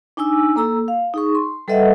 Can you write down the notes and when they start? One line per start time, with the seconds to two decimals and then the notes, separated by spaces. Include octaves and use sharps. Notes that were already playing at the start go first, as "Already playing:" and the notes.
0.17 D4 D#4 G#5 D6 E6
0.56 A#3 A4 A#5 E6
0.88 F5
1.14 D#4 G#4 C#6
1.35 C6
1.68 G3 A4 B4 D#5 E5 F#5